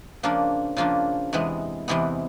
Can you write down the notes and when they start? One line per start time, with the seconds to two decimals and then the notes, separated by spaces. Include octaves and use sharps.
0.23 C#3 F3 A#3 D4 F4
0.77 C#3 F3 A#3 D4 F4
1.33 E2 C3 E3 G#3 B3
1.88 E2 C3 E3 G#3 B3